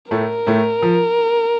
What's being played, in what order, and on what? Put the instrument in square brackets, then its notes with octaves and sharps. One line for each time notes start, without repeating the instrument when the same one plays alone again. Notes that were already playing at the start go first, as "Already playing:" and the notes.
[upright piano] A2 A3 [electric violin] A#4
[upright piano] A2 A3
F3